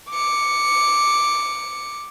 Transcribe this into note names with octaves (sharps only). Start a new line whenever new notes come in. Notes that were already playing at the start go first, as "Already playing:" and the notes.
D6 C#7